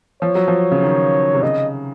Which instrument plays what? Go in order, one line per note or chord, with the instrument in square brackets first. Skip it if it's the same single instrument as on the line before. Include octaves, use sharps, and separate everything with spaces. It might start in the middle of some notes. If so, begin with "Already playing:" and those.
[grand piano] F3 [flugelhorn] C#5
[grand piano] F#3
F3
C#3
D#3
C3
[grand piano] C#3 [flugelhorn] D#5